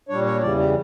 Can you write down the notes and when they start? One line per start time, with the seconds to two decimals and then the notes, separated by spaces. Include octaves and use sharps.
0.09 A#2 G3 D4 C#5
0.26 C#5
0.41 E2 C#3 E3 G3 D5
0.58 G4